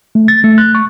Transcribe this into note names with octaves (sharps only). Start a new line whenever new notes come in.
A3
A6
A3
F#6
C#6